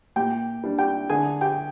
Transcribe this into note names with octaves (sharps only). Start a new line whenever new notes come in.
A#2 G4 G5
G3 D4
G4 G5
D3 G#4 G#5
G4 G5